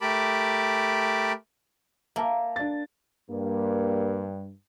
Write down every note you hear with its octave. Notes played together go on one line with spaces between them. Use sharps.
A3 G4 A#4 A5 B5 D6
A#3 E5 A5 A#5
D4 A6
G2 A#3